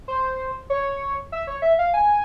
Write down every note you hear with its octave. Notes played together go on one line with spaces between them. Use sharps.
C5
C#5
E5
C#5
E5
F5
G#5